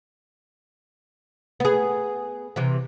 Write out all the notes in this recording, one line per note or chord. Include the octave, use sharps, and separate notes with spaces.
B3 G#4
C3 E3